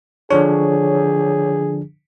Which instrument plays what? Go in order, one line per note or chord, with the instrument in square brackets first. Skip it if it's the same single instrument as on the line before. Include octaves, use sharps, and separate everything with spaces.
[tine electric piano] D3 F3 D4 [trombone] G#4 [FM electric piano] C#5